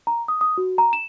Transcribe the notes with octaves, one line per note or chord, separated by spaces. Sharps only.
A#5
D#6
D#6
F#4
A#5
E7